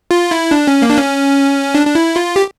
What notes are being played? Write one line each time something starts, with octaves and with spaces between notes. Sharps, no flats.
F4
E4
D4
C#4
A#3
D4
C#4
D4
D4
E4
F4
G4